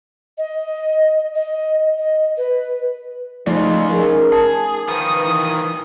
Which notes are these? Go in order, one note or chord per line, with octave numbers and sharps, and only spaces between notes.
D#5
D#5
D#5
B4
G#2 C#3 F3 G3 A3 D#4 F4 D5
C#4 D#4 G#4 A#4
G#4 A5
D#3 F3 B4 D#6
E3